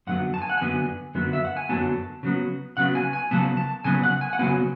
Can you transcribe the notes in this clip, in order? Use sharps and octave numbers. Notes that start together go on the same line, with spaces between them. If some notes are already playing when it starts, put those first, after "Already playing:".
F#2 D3 F#3 B3 F#5
A5
G#5
F#5
F#2 D3 F#3 B3 G#5
F#2 D3 F#3 B3
E5
F#5
G#5
F#2 D3 F#3 B3 A5
C#3 F#3 B3
C#3 F#3 B3 F#5
G#5
G#5
C#3 F#3 B3 A5
A5
C#3 F#3 B3 G#5
F#5
G#5
F#5
C#3 F#3 B3 G#5